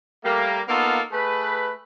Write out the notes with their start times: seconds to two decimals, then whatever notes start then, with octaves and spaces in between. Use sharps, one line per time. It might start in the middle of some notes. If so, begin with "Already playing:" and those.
0.24 G3 A3 A#3
0.68 A#3 B3 D#4 F4 A4
1.12 A3 G#4 B4